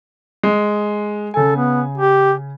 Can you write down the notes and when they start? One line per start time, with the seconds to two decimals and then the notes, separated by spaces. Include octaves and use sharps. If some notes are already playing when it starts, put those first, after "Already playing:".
0.43 G#3
1.34 C#3 A4 G#5
1.56 B3
1.98 G4